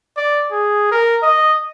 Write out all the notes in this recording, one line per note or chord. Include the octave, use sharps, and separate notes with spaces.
D5
G#4
A#4
D#5